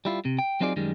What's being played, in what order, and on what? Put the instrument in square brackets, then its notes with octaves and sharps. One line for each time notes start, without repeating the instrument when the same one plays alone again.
[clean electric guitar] G3 E4 F4
C3
G5
F#3 C4 D#4 F4 G#4 D5
F#2 D#3 G3 G#3